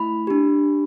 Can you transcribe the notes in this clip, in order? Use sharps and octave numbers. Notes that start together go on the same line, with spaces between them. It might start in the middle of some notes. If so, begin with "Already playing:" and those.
Already playing: A3 E4 B5
D4 G4